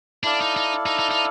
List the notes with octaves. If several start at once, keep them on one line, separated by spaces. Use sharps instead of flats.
D4 E4 A4 D5 F5
D#4
D#4
D#4
D#4
D#4